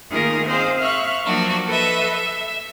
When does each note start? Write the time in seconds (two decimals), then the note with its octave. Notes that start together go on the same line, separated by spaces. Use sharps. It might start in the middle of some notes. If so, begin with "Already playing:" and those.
0.11 D#3 A3 A#3 F4 G#4 A#4
0.46 C4 G#4 C5 D#5 F5
0.79 E5 F5 C#6 F6 F#6
1.23 F3 F#3 A#3 D4 F#4
1.66 A4 B4 D#5 E5
2.14 E5